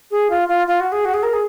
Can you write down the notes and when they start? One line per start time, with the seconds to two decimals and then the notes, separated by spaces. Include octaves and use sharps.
0.11 G#4
0.30 F4
0.48 F4
0.67 F4
0.80 F#4
0.92 G#4
1.05 F#4
1.14 G#4
1.23 A#4
1.33 G#4